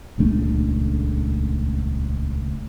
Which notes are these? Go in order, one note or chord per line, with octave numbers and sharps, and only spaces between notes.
D#1 C#2 A3 D4